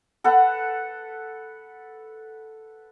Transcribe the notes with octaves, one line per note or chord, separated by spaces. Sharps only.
A4 B4 F#5